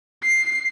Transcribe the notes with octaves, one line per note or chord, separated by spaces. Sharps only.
C7